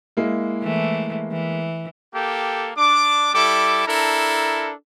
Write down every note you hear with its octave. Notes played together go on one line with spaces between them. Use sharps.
G#3 A#3 E4
E3 A3
E3
A#3 G4 A4 G5
D4 D6
G3 E4 A4 D6
D4 E4 A4 A#4 A#5